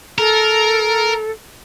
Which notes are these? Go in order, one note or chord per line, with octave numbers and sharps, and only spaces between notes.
A4 A#4